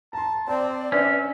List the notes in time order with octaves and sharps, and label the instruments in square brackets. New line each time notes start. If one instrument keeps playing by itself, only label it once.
[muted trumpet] A5 [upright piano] A#5 C6
[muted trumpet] C4 [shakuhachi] D5 [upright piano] A5
[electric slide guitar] C#4 [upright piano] D4 B4 [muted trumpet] E5